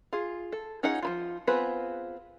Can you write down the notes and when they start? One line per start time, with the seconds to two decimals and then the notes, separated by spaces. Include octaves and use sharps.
0.13 F4 G#4
0.52 A4
0.83 C#4 D#4 F4 G#4 F#5
1.02 F3 E4 F4
1.47 B3 C4 F4 G#4 B4